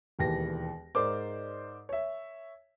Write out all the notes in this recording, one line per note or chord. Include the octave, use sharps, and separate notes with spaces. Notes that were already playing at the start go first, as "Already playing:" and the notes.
E1 D#2 E3 A#6
G#2 A#4 C5 D5 D6
C#5 E5